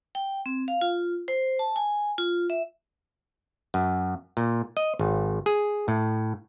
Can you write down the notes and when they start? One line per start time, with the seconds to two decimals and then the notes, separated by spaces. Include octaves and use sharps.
0.15 G5
0.46 C4
0.68 F5
0.81 F4
1.28 C5
1.59 A5
1.76 G#5
2.18 F4
2.50 E5
3.74 F#2
4.37 A#2
4.77 D#5
4.99 G#1
5.46 G#4
5.88 A2